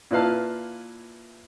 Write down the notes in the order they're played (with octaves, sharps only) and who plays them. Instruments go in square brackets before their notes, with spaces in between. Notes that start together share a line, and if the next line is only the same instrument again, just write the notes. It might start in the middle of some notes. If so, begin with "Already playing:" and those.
[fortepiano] A#2 E4 B4 F5 A5